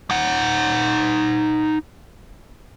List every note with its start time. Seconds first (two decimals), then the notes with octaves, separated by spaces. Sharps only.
0.11 D#4 F#5